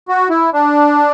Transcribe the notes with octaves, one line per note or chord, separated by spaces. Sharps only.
F#4
E4
D4